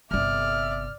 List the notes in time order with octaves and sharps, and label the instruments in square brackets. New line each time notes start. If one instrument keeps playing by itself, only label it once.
[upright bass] G1 C3 [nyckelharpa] D5 [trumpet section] E5 [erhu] F6